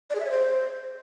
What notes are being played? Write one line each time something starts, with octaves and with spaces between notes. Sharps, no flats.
D5
G#4
E5
C#5
C5